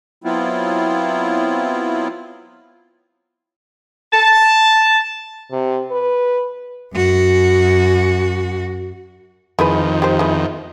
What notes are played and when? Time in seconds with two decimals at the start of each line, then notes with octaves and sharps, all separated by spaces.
0.24 F#3 B3 C4 E4 F4
4.13 A5
5.51 C3
5.91 B4
6.94 F#2 F#4
9.59 F2 D#3 G#3 E4 B4
10.02 G4 C5
10.19 G#3 B3 E4